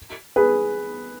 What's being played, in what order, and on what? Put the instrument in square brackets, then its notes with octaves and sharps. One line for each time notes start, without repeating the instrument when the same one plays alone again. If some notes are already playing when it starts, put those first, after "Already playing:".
[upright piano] G#4 B4